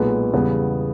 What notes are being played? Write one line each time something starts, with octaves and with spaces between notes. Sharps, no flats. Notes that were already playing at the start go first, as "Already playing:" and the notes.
Already playing: B1 A#2 G#3 B3
E2 C#3 G3 B3